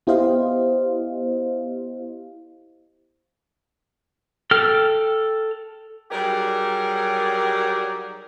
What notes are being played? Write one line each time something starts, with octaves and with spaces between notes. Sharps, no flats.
B3 E4 G4 C5 D#5 F5
A4 G5 F6
F#3 G3 D#4 G4 G#4 A#4